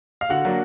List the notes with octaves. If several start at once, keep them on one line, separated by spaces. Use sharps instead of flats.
F5
D3 F#4 F#5
F#3 A#3 D4